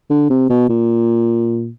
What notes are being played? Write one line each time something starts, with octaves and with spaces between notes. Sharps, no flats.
D3
C3
B2
A#2